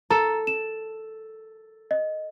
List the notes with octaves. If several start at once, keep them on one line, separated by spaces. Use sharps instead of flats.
A4 A#5 E7
E7
D#5